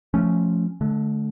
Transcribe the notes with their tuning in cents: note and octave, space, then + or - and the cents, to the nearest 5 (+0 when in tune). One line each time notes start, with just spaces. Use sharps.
F3 +0 A3 +0 C#4 +0
D3 +0 A3 -40